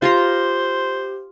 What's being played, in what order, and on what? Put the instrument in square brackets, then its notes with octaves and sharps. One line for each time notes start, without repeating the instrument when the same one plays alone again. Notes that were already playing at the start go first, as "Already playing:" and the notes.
[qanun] F4 A#5 C6 [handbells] G4 [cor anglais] C5